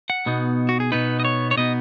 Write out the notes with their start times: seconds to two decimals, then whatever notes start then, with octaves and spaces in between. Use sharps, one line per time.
0.10 F#5
0.26 B2 B3 D#4
0.69 F#4
0.80 G#4
0.92 B2 B3 D#4 B4
1.20 D#5
1.25 C#5
1.51 C#5
1.57 B2 B3 D#4 D#5